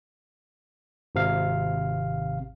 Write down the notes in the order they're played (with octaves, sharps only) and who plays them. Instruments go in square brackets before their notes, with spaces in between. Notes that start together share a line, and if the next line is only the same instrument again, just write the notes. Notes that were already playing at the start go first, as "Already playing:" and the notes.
[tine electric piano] G#1 C3 F5